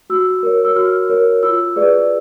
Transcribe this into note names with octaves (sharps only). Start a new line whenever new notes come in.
F#4 E6
A#4 C#5
E6
F#4 F6
A#4 C#5
F4 E6
G#4 B4 D5